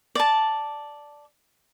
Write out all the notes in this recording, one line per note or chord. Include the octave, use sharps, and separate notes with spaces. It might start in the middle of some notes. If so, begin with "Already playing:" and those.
D5 A5